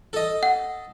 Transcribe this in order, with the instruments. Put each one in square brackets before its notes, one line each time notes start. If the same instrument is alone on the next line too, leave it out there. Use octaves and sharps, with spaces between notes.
[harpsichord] A4 D#5
[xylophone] F#5